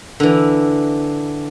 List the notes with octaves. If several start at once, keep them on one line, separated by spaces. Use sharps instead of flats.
D3 E3